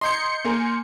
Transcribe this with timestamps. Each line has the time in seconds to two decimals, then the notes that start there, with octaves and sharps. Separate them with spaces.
0.01 D#5 A#5 C6 G6 G#6 C#7
0.45 A#3 A#4 G#5